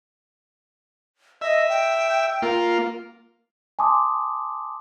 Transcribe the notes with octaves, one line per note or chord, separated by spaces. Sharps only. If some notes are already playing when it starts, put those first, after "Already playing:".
D#5 E5
G5
A#3 F4
G#5 A5 C6 D6 D#6